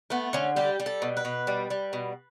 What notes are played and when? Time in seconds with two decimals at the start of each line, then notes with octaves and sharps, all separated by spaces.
0.10 A3 B3
0.33 D3 C#4
0.56 G3 G4
0.80 G3
0.86 A4
1.02 B2
1.17 B4
1.25 B2
1.47 G3
1.70 G3
1.93 B2